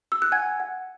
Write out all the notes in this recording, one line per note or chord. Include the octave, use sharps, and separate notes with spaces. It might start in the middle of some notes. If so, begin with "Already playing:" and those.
E6
F#6
F#5 G#5 G#6
F#5